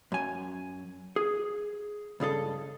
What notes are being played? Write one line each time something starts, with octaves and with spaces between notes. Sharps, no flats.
F#2 G#5
G#4
C#2 G2 G#4 A4